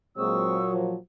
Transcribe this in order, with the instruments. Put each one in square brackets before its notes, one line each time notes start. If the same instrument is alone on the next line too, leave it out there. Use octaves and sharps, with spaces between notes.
[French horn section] A#2 F#3 A#3 [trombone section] G#3 C4 [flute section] C#6 D#6 E6
[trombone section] F3